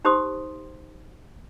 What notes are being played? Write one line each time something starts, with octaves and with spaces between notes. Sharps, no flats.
D#4 G4 C5 C6 D#6